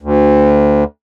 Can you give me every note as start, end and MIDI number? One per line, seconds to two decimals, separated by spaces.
0.02 0.84 38